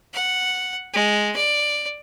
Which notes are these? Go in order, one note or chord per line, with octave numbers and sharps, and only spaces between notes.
F#5
G#3
D5